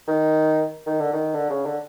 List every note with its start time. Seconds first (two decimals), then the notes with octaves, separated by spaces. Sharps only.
0.08 D#3
0.87 D#3
1.00 D3
1.13 D#3
1.34 D3
1.50 C#3
1.66 D3